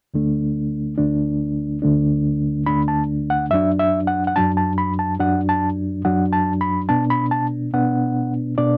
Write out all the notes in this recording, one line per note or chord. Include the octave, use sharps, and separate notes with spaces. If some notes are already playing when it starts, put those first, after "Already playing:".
D2 D3 A3 D4
D2 D3 A3 D4
D2 D3 A3 D4
D2 D3 A3 D4 B5
A5
F#5
F#2 F#3 D4 E5
E5
F#5
F#5
F#2 F#3 D4 A5
A5
B5
A5
F#2 F#3 D4 F#5
A5
F#2 F#3 D4 F#5
A5
B5
B2 B3 D4 A5
B5
A5
B2 B3 D4 F#5
B2 B3 D4 D5